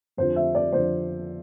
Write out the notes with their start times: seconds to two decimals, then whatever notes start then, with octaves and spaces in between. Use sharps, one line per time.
0.17 F2 D3 F3 C5
0.36 E5
0.55 D5
0.72 F2 D3 F3 C5